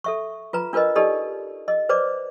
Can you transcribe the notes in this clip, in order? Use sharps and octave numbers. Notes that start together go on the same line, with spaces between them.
A4 E5 C#6
F4 B4 A#5
D4 F4 A#4 B4 D#5
D#4 G4 A4 D5 D#5
D#5
B4 C5 D5 D6